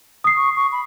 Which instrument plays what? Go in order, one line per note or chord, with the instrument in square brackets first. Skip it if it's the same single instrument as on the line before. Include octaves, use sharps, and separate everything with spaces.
[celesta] D#6 C7
[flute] C#6
C#6
B5